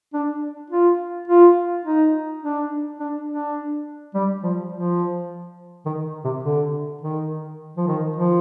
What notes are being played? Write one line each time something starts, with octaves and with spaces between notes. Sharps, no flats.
D4
F4
F4
D#4
D4
D4
D4
G3
F3
F3
D#3
C3
D3
D#3
F3
D#3
F3